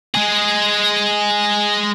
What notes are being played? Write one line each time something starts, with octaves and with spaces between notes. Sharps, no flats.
G#3 G#4